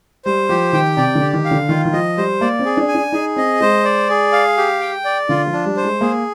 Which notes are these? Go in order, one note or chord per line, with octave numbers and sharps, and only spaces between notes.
G3 C5
F3 G4
D#3 G5
C3 D5
D3
G4
D#3
F5
D3
D#3 F4
D#3
F3 D#5
G3 C5
A#3 D5
C4
G#4
D4
G#5
D4
D#4 G#4
C4 D#5
G#3 C5
D5
G#4
F5
G4
G5
D5
D3 F4
F3
D4
G3
C5
G#3
A#3 G#4